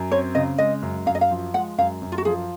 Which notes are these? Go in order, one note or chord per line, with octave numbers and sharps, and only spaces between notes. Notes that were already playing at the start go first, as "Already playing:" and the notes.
Already playing: F#2
C4 C#5
C#3 D#5
G#3 D#5
F#2
F#2 F5
D#5
F5
F3
G#3 F#5
F#2 F5
F#2
F4
F#4
F3 G#4